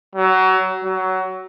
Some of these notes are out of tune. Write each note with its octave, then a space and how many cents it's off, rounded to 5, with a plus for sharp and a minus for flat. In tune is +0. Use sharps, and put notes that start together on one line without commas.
F#3 +25
F#3 +20